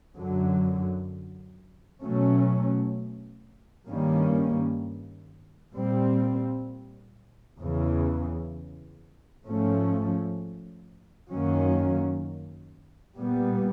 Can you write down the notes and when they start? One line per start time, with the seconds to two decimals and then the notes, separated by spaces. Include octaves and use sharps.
0.16 F#2 D3 F#3
2.02 B2 F#3 A3 C#4
3.88 G2 D#3 G3 A#3 C#4
5.74 A#2 G3 C4
7.59 E2 C#3 E3
9.45 G#2 F3 A3 C#4
11.32 F#2 D#3 F#3 A#3 C#4
13.17 A#2 G3 B3